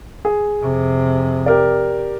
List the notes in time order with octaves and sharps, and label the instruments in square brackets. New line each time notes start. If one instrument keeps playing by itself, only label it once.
[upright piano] G#4
[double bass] F2 C3
[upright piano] G4 A#4 D5